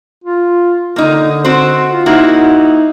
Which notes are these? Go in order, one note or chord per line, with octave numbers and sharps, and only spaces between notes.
F4
D3 A#3 D#4
C4 F#4 C5
F4
A#3 D#4 E4 F#4